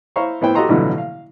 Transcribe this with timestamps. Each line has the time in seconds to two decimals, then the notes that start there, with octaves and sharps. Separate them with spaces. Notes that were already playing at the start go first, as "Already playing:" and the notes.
0.16 E4 C5 F5 A#5 C#6
0.41 A2 B3 E4 C5 G5
0.55 F#4 G4 A4 D#5 A#5 C6
0.69 A1 B2 D3 F3 F#3
0.98 F5